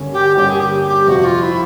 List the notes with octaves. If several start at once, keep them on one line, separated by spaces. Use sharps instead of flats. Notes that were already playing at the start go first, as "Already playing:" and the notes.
Already playing: G2 D3 G3 A#3 C#4
G4
G2 D3 G3 A#3 C#4 G4
G#4
G4
G4
F2 C3 F3 F#4
F4
E4